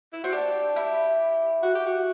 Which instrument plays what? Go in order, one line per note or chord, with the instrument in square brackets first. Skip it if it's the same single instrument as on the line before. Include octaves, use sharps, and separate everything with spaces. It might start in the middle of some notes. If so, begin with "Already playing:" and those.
[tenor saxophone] E4
[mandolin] C4 [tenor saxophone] F#4
[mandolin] D4 [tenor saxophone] G4
[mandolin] E4
[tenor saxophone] F#4
G4
F#4